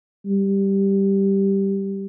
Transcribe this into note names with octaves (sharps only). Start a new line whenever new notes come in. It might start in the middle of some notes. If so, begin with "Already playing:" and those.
G3